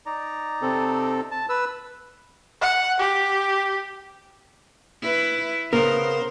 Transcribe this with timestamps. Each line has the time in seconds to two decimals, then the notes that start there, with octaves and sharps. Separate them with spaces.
0.06 D#4 D5 A#5
0.62 C3 C4 A4
1.31 A5
1.49 B4 E6
2.61 F#5
3.00 G4
5.01 E4 B4
5.73 C#3 B3 C4 A#4 C5